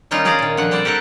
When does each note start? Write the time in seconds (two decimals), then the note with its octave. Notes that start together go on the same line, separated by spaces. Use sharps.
0.11 D#3 G3 C#4 D#4 F4
0.25 C#4 G#4 D5 F5 A#5
0.39 A#2 D#3
0.57 D3 F3 F#5
0.71 G3 C4 C5 D5
0.85 G4 A4 A#4 F#5